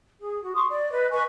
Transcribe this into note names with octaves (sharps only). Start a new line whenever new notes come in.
G#4
F#4
C6 C#6 D#6
D5
B4 D#5
B4 D#5 G#5 C#6